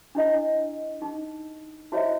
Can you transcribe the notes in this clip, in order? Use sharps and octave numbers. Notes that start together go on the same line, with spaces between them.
D4 E4 D#5
D#4
E4 F#4 C5 C#5 D#5 E5